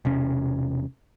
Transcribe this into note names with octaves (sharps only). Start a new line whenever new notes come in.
E1 C3 C#4